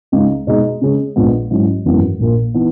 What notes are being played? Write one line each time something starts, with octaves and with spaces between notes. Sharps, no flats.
C#2 C#3 G#3 D#4
B2 G#3 D#4 G#4
C#3 G#3 C#4 G#4
A#1 A#2 G#3 B3
G#2 F#3 C#4 E4
G#1 F#2 E3 B3
A#1 A#2 A#3
E3 B3 D#4